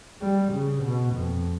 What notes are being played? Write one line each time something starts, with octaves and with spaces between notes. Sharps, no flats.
G3
C#3
B2
F2